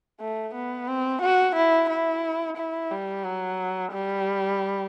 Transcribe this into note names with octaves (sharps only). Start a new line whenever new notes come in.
A3
B3
C4
F#4
E4
E4
E4
G3
F#3
G3